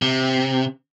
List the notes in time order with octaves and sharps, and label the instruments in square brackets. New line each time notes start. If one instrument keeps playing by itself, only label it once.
[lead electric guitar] C3